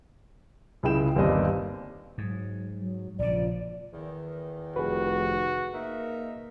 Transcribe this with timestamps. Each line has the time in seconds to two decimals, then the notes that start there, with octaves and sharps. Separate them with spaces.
0.83 C#2 C#3 E4 G#4 G5 E7
1.16 G1 D#2 G3 C4 D#5
2.18 G#2 F#3
2.78 F#3
3.19 A#1 C#3 F3 D5
3.93 E2 D#3
4.76 F1 F#4 G#4 B4
5.74 A#3 D#4 A#4 E5